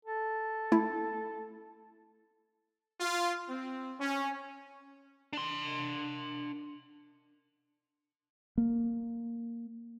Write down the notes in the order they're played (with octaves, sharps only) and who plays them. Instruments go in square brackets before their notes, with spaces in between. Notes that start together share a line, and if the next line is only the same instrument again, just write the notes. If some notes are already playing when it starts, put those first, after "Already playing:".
[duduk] A4
[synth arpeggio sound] A3 E4
[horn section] F4
C4
C#4
[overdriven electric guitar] D4 C6
[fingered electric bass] A#3